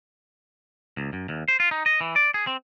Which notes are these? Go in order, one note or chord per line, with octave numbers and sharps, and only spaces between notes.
C#2
F#2
D#2
C5
F4
D#4
D#5
E3
D5
G#4
C4